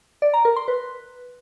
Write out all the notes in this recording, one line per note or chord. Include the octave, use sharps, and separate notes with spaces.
D5
A#5
A#4
C6
B4